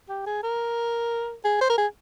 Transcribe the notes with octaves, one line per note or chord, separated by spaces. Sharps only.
G4
G#4
A#4
G#4
C5
A#4
G#4